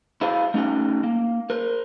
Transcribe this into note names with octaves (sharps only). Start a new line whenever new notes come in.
E4 G#4 C5 F5
A3 C#4 D#4 G#4 G5
A#3
A#4 C5